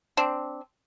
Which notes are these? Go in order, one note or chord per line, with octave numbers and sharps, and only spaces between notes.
C4 D4